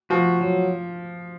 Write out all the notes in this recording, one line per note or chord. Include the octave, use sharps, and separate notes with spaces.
F3 F#4
F#3